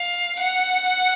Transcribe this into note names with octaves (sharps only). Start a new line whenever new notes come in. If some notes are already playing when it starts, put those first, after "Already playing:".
Already playing: F5
F#5